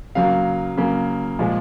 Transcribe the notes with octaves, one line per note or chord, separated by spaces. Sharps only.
C#3 F#3 A#3 F5
C#3 F#3 A#3
A#2 F3 G#3